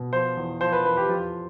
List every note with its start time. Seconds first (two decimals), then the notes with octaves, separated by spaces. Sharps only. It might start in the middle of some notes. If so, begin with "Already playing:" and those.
Already playing: B2
0.13 F3 C5
0.37 E2
0.61 F3 C5
0.72 B4
0.85 E2 B4
0.97 G4
1.09 F2 F4